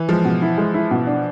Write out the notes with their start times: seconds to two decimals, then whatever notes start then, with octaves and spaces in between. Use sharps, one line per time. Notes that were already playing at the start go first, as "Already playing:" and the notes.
Already playing: E3
0.08 F3 G#3
0.25 B2
0.42 E4
0.58 G#3
0.74 E4
0.91 B2
1.07 D4